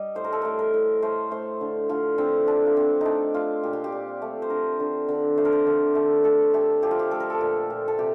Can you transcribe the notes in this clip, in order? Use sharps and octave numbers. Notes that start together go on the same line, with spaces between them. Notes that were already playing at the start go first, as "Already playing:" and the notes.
Already playing: G3 D#5
A2 C5
A#4
A4
A2 A#4
A#4
A2
A3 C5
A3 C5
D3
D3 F4
D3 C4
D3 D4
A#3
A3 C4
A3 D4 D#4
A3 F4
A#2 G4
F4
G4
A#2
A3
C5
D3 A#4
D3
D3
A3 C5
A#4
C5
D3
A3
A3 A4
A3 G4
F3 G4
F4
G4
A3 A4
A#4
A4
A#2
A#2
A4
C3 G4